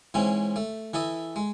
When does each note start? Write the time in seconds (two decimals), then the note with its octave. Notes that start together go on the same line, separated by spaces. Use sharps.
0.14 G#2 E3 C4 C#4
0.56 A3
0.94 E3 E4 A4 D#5
1.36 G#3